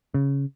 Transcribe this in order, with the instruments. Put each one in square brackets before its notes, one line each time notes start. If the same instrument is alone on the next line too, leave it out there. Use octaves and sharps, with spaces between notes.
[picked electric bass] C#3